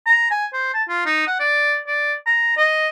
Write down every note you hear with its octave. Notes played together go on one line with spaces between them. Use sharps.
A#5
G#5
C5
A5
F4
D#4
F#5
D5
D5
A#5
D#5